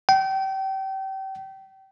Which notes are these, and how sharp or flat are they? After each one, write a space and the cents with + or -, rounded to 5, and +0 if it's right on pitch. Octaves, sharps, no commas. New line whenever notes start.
G5 -30